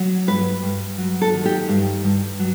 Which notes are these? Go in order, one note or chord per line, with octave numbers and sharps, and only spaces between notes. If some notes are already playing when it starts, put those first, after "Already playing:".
Already playing: F#3
G2 B4
G2
F#3
A4
D#3
G4
G2
G2
F#3